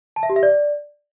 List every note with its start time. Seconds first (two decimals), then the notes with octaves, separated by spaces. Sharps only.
0.16 A5
0.23 E5
0.30 G4
0.36 E5
0.43 D5